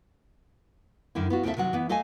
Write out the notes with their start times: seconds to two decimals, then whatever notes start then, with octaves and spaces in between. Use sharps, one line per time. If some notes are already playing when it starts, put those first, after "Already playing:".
1.15 F#2 D3 D#3 E4
1.30 B3 F4 F#4
1.43 D#2 C#3 C4 F4 A4 E5
1.57 C3 D#3 F#3 F#5
1.73 E3 B3
1.89 A3 A4 D#5 F5 G#5